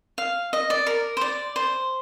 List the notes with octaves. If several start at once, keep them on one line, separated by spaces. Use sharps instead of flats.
F5
D#5
D5
A#4
C5
D5
C5